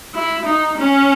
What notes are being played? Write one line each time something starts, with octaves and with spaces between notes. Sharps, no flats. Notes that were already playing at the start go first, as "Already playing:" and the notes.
E4
D#4
C#4